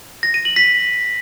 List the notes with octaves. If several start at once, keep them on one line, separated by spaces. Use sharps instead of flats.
A#6
D#7
F#7
B6